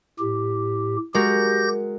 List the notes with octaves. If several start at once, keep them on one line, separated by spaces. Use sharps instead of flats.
A2 G4
G#3 F#4 G4 A#4 G6 A#6